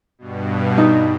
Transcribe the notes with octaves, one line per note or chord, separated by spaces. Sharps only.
G2 B2
D#4